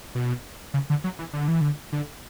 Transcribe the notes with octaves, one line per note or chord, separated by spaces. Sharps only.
B2
C#3
D3
F#3
E3
D3
E3
D3
D3